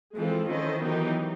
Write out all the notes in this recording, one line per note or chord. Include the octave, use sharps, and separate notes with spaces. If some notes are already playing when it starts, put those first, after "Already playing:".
E3 F3 G#3 C4 F4 A4
D#3 C#4 E4 A4 C5 D#5
D#3 E3 F#3 B3 D#4 G4